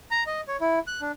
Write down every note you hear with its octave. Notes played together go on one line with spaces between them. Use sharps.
A#5
D#5
C#5
E4
F#6
D4